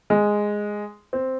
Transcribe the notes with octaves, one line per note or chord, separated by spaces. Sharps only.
G#3
C4